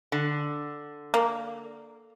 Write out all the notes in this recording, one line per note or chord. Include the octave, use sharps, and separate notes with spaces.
D3
A#3